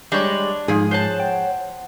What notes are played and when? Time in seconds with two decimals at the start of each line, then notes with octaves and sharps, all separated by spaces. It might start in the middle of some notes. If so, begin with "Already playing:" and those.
0.12 G3 G#3 D4 C#5
0.68 G#2 F3 D#4 G#4
0.91 C5 C#5 F#5 A5
1.20 G5